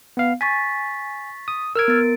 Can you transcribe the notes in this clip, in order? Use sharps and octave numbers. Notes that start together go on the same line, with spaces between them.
B3 F5
G#5 C#6 A6 B6
D#6
A#4 E6 F6 G#6 D7
B3 A6